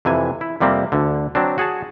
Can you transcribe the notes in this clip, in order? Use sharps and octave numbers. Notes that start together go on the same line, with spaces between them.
F2 C3 E3 G#5
E4
F2 C3 G3 A#3 C4
D2 D3
F#3 C4 D4
F#4 G#4 F#5 A5